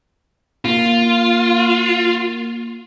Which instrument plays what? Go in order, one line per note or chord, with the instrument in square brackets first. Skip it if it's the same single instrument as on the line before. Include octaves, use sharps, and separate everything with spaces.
[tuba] A#3 [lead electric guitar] F4